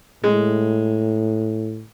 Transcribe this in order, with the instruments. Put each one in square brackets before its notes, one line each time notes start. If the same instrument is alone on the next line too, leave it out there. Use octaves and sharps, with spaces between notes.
[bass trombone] A2 [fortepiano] G#3